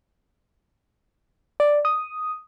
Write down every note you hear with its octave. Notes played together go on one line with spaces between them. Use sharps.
D5
D#6